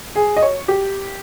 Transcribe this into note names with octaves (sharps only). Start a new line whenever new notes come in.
G#4
D#5
C#5
G4